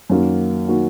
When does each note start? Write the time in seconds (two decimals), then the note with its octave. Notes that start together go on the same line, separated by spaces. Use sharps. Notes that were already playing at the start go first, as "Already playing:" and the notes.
0.10 F#2 D#3 A#3 F#4
0.68 D#3 A#3 F#4